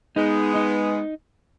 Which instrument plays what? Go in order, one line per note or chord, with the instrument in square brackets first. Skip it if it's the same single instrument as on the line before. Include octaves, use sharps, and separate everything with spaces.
[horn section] G#3 B3 [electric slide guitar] D#4
[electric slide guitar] D#4